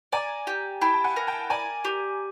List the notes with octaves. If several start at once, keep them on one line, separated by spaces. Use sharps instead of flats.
D5 G#5 A#5
G4
E4 G5 A5
A5
F#5 G#5
A#4
G5 A5
D5 G#5 A#5
G4